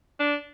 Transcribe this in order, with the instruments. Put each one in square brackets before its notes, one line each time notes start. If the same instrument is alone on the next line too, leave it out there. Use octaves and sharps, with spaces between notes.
[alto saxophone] D4